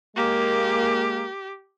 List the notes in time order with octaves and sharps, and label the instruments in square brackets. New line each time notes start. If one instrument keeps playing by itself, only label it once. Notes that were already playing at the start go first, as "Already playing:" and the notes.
[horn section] G#3 A#3 [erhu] G4